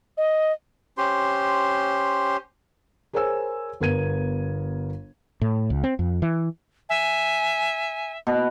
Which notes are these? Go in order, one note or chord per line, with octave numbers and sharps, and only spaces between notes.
D#5
C#4 G4 C5 C6
G#4 A#4 C5 C#5 G#5 E6
G1 B3 A#4 G#6 D#7
A2
C#2
C4
F2
E3
E5 G#5
B2